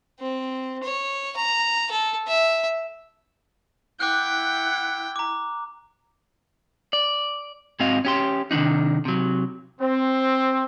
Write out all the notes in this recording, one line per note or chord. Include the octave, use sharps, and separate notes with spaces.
C4
C#5
A#5
A4
E5
E4 F#5 G5 D6 F#6
A#5 D6
D5
G#2 G#3 C4 F#4 D#5 F5
C#4 G4 C6
C3 D#3 F3 D4 D#4
C3 F#3
C4